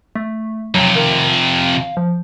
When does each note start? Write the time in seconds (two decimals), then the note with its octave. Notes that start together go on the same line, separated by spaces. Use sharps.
0.15 A3
0.75 F2 C3 F#3
0.96 D#3
1.33 F5
1.97 F3